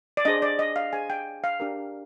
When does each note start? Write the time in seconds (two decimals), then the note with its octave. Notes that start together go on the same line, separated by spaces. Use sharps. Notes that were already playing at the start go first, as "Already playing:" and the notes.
0.17 D5
0.25 D4 G#4 C5 D#5
0.42 D5
0.59 D#5
0.76 F5
0.93 D4 G#4 C5 G#5
1.10 G5
1.44 F5
1.60 D4 G4 A#4